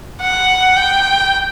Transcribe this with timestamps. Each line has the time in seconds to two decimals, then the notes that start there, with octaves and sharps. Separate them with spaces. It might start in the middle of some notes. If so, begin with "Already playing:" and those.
0.22 F#5
0.77 G5